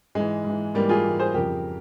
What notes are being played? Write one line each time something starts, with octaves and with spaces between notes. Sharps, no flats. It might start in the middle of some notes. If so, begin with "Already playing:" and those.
G#2 E3 G#3
G#2 E3
G#2 E3 G3 A#3
F4 G#4
G#2 E3
G#4 C5
F2 C#3 F3 G4 A#4